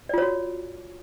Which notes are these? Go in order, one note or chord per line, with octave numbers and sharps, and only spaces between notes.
F4 F#4 C#5 D5